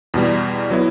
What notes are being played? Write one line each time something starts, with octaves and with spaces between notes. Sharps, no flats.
E2 B2 G3
F#3 B3 E4